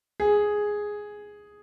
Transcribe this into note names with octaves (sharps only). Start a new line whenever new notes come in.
G#4